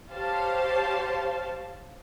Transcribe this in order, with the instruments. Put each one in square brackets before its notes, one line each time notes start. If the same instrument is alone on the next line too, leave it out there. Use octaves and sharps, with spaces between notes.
[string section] G4 C5 C#5 F5 A5